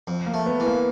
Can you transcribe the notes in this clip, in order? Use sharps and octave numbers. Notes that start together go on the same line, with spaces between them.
F2
A#3
A3
B3
E3
A#3